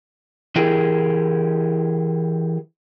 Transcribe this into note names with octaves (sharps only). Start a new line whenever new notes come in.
E3 E4 G4 G#4 A#4